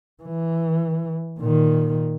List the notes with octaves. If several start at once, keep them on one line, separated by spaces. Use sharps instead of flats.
E3
A#2 D#3